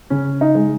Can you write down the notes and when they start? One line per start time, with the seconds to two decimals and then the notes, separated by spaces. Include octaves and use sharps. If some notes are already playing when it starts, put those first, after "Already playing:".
0.10 C#3 C#4
0.41 D#4
0.55 G#3